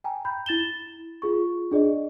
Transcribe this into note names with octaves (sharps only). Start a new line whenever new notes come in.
G5 G#5 A#5
B5 G6
E4 A6 E7 G7
F4 G#4 C#6
D4 G#4 D5 D#5